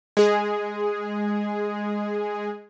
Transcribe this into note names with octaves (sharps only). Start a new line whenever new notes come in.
G#3 G#4